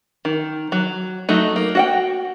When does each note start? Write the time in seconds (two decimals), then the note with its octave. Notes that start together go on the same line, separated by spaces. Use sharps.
0.25 D#3
0.72 F#3
1.29 F#3 A3 D#4
1.56 A#3
1.75 F#4 F#5 G5